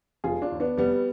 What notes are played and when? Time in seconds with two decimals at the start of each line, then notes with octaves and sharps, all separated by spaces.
0.24 F1 F4 G#4
0.42 D4 F4
0.51 D#2 D#3
0.60 B3 D4
0.77 F1 G3 B3